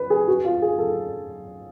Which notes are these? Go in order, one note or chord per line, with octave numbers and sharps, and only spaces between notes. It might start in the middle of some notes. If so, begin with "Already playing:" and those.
Already playing: B4
G#4
F#4
F4
G#4
A4